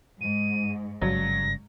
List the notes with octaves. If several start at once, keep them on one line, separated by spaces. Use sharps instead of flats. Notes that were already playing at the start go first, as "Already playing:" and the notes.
G#2 D#7
G1 G2 C#3 F#3 A#6